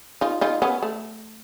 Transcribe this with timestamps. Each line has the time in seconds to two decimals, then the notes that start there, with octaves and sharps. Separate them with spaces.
0.21 D#4 F4
0.41 D#4 F4
0.62 B3 C#4
0.82 A3